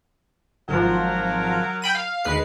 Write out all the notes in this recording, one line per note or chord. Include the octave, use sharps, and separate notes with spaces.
G#1 F3 F#3 A#4
G5 B5 D#7
F5
D#2 G#3 B4 C7